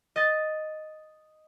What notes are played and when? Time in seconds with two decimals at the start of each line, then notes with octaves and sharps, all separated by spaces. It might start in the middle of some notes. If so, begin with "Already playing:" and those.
0.16 D#5 A6